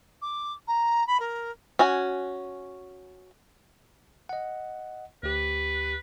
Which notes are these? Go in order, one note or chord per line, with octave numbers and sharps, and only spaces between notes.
D6
A#5
B5
A#4
C#4 F#4 G#5
D#5 F#5
D2 G4 B4